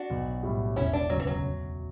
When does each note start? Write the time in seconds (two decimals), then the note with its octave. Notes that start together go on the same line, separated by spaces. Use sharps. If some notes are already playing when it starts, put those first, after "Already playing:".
Already playing: D4 F#4
0.10 B1
0.43 A2 G3
0.76 E1 C#4 E4
0.93 D4
1.10 D2 C#3 F#3
1.20 E3
1.27 F#3
1.43 E1